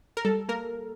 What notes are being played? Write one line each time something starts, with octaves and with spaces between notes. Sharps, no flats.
A#4
G3 A4
A#3 A#4